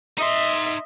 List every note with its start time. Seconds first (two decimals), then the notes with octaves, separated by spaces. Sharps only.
0.18 D#4 D#5 E5 C6